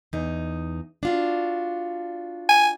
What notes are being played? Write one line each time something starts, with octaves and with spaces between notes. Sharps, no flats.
E2 D#4
D4 F4 F#4
G#5